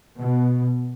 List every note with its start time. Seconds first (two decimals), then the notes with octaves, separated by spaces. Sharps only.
0.20 B2